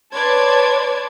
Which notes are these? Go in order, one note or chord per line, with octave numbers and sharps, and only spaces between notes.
B4 C#5 D5 A5 C6 G#6